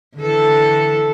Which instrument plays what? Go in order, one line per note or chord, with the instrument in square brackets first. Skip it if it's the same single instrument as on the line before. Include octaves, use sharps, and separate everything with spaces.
[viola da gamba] D3 E3 A4